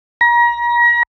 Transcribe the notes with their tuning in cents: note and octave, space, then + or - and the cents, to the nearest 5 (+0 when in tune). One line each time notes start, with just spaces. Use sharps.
A#5 +35